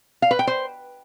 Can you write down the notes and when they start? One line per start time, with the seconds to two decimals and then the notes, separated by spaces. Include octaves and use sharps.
0.22 F5
0.31 B4
0.39 G5
0.47 C5